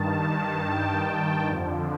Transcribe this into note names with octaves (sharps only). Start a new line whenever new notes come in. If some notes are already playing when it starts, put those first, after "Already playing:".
Already playing: G2 D#3 A5
A5
G5
F2 D3 F3